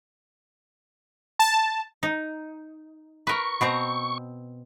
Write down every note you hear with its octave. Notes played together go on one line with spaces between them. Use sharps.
A5
D#4
A#4 B4 C#6
B2 C4 A#5